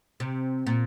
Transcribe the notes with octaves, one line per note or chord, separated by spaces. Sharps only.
C3
A#2